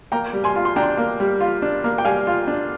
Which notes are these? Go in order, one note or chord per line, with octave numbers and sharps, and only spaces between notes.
A#3 G5 A#5
G3
G#5 C6
F4
C6
D4 G5 A#5
A#3
G3
F4
D4
A#3
G5
G3 F5 G#5
F4
D4